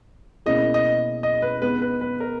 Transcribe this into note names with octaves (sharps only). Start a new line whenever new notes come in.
B2 A#3 C#4 E4 G#4 D#5
D#5
D#5
B4
G#3 B3 D#4 B4
B4
B4
A#4